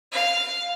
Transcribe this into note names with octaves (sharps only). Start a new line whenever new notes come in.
F5